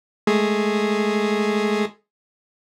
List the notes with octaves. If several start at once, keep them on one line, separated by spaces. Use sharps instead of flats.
G#3 A3 G#4